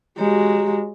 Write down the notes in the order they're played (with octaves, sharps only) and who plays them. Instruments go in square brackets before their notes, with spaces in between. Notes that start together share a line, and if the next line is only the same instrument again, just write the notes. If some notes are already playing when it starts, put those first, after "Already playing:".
[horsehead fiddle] G#3 F#4 [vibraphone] G4 C#5 A#5